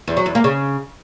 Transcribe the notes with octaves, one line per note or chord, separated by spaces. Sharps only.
E2
F#3
E2
A#3
C#3